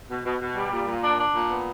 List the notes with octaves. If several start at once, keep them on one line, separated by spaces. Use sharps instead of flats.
B2
B2
B2
G3
A#2
A#2
D4
D4
A#2
B3